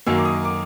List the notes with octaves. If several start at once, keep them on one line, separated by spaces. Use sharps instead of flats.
F#2 D#3 F#3 A#3 E6
D6
D#6
D6